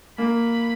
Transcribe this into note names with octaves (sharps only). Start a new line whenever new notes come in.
A#3 B5